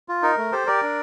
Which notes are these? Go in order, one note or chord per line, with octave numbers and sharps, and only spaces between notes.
F4
D#4 A#4
A3
G4 A4 C5
G4 A#4 D5
D4